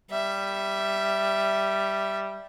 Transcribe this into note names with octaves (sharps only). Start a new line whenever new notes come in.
G3 E5